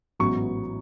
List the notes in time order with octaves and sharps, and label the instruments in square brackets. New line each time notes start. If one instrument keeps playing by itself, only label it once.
[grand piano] A1 G#2 F#3 B3 C#6